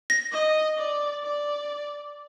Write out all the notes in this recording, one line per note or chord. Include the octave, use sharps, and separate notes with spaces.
A#6
D#5
D5
D5